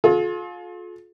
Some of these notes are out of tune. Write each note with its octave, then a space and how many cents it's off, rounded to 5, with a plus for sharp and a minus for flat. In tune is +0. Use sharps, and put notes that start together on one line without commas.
F4 +30 A4 -45